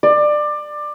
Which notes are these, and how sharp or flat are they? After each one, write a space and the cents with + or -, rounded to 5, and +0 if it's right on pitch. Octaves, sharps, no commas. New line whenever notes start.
D5 +20